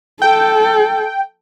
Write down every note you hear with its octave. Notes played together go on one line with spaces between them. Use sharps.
A4 G5